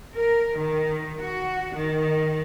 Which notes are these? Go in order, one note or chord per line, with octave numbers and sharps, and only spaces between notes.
A#4
D#3
F#4
D#3